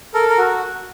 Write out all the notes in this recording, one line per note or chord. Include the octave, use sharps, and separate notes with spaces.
A4 A#4
A#4
F#4